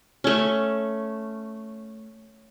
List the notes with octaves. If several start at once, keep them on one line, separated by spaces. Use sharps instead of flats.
A3 C#4